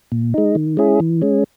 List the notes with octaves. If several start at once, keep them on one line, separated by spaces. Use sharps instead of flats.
A#2
G#3 D#4
D#3
G#3 C#4 E4 G#4
E3
G#3 C#4